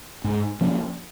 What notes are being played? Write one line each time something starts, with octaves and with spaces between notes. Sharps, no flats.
G#2
F3 A#3 C#4